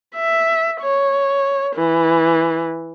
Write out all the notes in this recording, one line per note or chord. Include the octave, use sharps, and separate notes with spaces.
E5
C#5
E3